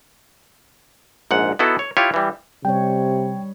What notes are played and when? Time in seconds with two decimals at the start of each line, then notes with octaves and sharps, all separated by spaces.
1.31 A#1 G#2 F#5
1.59 B3 D#4 E4 F#4 A4
1.79 C#5
1.97 E4 F4 G4 C#5
2.14 E3 G3
2.65 C3 G3 C#5 G5